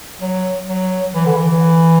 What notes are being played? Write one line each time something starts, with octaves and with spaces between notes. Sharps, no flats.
F#3
F#3
E3
D3
E3